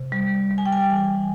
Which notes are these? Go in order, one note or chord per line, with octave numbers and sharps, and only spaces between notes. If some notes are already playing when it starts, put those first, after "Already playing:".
Already playing: C3
G3
G3
G#5
G5
G#5
E3